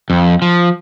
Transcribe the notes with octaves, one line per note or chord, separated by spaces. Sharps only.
F2
F3